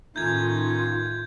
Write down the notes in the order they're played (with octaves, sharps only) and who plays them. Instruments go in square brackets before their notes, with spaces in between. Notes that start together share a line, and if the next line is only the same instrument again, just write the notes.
[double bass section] A2 D#3 [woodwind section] A3 C#4 D#4 [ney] F4 [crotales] G6 G#6